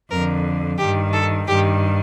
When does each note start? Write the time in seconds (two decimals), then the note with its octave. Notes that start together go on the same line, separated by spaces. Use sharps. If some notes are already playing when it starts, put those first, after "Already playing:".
0.11 F2 D3 A#4
0.79 G2 D#3 G4
1.13 A4
1.47 G2 D#3 G4